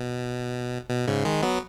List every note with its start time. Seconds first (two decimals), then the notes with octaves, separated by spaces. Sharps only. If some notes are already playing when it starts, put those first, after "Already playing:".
Already playing: B2
0.90 B2
1.07 G#2 C#3
1.25 D#3 G#3
1.42 F#3 B3